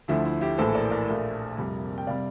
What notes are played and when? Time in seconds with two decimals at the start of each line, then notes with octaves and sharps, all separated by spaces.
0.08 D2 D3 F3 A3 E4
0.25 E4
0.41 E4 G4
0.58 A#1 A2 E3 A4 C5
0.74 A#4 D5
0.91 A#4 D5
1.07 A#1 A#2 A3
1.58 F2 C3 G3
1.98 G5
2.07 C3 G3 D5 F5